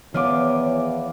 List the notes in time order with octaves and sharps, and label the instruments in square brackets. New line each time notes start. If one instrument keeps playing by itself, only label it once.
[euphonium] E2 [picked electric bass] D#3 F3 B3 [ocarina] C#5 [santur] F5 D6